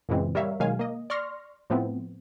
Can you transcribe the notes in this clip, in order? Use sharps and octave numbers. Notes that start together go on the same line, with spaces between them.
F#2 A#2 C#3 E3 G#3 C4
G3 A#4 C#5 E5 F5
B2 D#3 F#3 G#3 F5 G#5
A#3 D#5
D5 C6 C#6 F6 A#6
A2 F3 A3 B3 C4